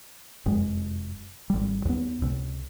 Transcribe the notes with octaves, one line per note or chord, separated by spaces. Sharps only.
F1 F#2 G#3
G#1 G3
D#2 B3
C#2 C3